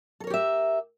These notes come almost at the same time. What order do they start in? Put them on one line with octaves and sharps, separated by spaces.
A4 A#4 C#5 G4 E5